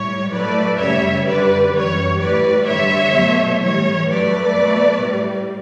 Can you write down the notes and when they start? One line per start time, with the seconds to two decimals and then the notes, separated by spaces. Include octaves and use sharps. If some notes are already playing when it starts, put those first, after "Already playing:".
Already playing: A2 G3 C#5
0.32 A2 F#3 A3 B4 D5
0.79 F#2 C#3 G3 C#5 E5
1.27 F#2 D3 G3 B4 D5
1.74 F#2 E3 G3 C#5
2.21 A2 G3 B4 D5
2.67 G2 D3 G3 C#5 E5
3.15 B2 F#3 A3
3.62 A2 E3 G3 C#5
4.09 G2 F#3 A3 B4 D5
4.57 B2 A3
5.03 A2 G3